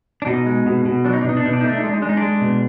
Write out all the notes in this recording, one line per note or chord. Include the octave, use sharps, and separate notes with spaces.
D4
B2 D#4
G#3
B2
B2
F#3 D4
D#4
D4
B2 D#4
D4
B2 D#4
D4
D#4
A3
D4
D#4
G#3 D4
D#4
G#3 D4
D#4
G#3 D4
B2